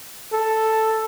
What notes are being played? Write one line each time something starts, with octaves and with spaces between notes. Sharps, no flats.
A4